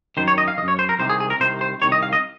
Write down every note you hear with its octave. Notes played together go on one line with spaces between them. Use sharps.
F#2 D#3 C5
C#5
D#5
F5
D#3 D#5
F#2
C#5
C5
A#4
C2 C3 D#3 C5
G#4
G#4
A#4
C2 C3 D#3 C5
C5
C2 C3 D#3 C#5
D#5
F5
D#5